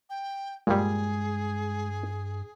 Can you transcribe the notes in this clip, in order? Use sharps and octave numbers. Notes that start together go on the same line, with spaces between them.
G5
G2 A#2 G3 G#3 G#4